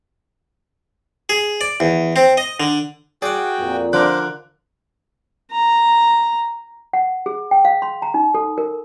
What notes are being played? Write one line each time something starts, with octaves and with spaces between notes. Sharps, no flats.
G#4
D5
E2
C4
D#5
D3
F#4 G#4 D5 F#5 G5
F2 A#2
D3 F3 D4 A#4 C5 D6 F#6
A#5
F#5
G#4
G5
F5
C6
A#5
D#4
A4
A#4